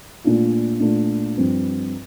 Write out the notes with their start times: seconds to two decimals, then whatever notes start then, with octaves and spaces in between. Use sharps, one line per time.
0.24 A#2 A3 D4 F4
0.80 A#2 A3 D4 F4
1.37 G2 F3 C4